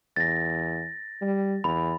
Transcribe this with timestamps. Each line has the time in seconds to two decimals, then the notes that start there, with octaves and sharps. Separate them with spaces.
0.16 E2 A6 A#6
1.21 G3
1.64 E2 B5